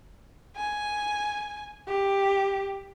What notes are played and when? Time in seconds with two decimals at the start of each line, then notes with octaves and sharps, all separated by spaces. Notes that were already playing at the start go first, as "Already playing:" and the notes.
0.56 G#5
1.87 G4